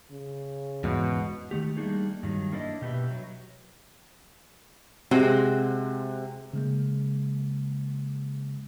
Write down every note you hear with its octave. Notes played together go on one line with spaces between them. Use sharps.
C#3
E2 G#2 B2
D#3 F3 A3 G4
G3 A3 A#3 D4 D#4 G#4
G2 D#3 F#3
A#3 D4 E4 B4 D#5
B2 G4 G#4 B4 E5
F#3
C3 G#3 C4 F#4
C#3 G#3 A#3